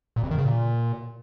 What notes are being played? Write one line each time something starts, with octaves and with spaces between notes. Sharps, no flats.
A#2
F2
D#3
C#3
A#2